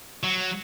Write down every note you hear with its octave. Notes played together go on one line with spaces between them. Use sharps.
F#3